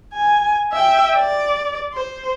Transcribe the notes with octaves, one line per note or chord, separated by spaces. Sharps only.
G#5
E5 G5
D5
C5